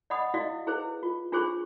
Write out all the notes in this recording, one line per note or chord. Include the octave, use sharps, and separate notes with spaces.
D5 D#5 F#5 B5 D#6
E4 F#4 D5 D#5 F5
E4 G#4 B4 C5
F4
D4 F4 G#4 C5 C#6